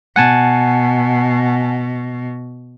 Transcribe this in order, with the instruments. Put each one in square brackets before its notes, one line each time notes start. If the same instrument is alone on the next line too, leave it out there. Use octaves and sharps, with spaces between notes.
[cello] B2 [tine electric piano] F#5 G#5 A5